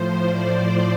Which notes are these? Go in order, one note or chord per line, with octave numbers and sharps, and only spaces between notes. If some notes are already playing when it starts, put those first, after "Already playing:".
Already playing: A2 F3 C5
D5